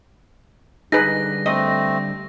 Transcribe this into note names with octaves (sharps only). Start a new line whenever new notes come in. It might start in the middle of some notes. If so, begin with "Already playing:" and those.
D3 G3 D#4 G#4 B4 A#6
A3 C4 D#5